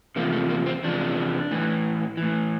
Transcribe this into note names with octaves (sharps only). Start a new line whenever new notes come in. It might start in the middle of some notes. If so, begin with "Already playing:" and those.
E2 C3 F3 A#3
A3
A#3
C4
E2 C3 F3 D4
A2 E3
E3
A2